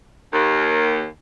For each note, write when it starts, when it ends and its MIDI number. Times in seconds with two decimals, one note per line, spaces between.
0.33 1.05 39